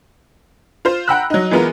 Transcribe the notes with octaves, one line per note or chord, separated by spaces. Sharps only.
F4 C5
F#5 G5 A#5 B5 E6 F#6
F#3 D#4
E3 G#3 B3 F4 A#4